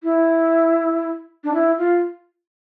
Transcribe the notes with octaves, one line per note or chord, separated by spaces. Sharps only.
E4
D4
E4
F4